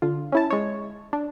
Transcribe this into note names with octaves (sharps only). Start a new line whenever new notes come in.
D3 F4
C#4 E4 A5
G#3 C#5
D4